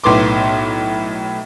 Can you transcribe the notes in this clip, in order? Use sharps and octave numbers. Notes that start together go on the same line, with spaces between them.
B1 A2 B3 C6 D6